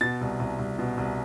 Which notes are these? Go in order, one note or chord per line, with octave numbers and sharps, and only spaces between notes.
B2 A6
C2
C2
C2
B2
C2